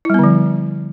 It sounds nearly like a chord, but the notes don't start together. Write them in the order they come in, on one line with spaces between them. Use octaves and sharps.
E4 G3 B3 D3 F3